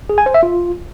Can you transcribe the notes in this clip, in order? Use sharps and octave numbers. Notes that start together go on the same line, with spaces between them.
G#4
G#5
C5
E5
F4